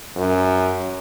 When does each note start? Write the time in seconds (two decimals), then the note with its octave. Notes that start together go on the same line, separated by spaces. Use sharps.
0.16 F#2